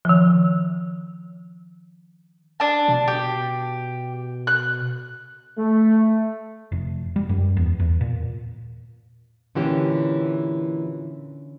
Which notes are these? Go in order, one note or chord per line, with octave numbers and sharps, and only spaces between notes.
D#3 F3
D4 A5
B2
G4
F#6
A3
F1
G3
F#2
E2
E2
A#2
A#2 D3 E3 C#4 G4